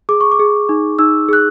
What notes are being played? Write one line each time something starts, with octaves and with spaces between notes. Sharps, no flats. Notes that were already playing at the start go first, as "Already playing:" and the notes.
G#4 D6
C#6
D6
G#4
D#4
D#4 E6
G#4 F#6